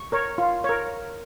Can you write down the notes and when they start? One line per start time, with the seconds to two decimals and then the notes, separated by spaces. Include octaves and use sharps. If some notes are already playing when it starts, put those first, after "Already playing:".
Already playing: C#6
0.12 A#4 C#5
0.38 F4
0.64 A#4 C#5